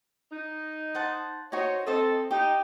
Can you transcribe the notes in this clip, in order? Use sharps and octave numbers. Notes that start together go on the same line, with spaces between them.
D#4
C5 F#5 A5
D#4 F#4 C5 C#5 D#5
C4 A4 C5 D#5 D#6
D#4 G4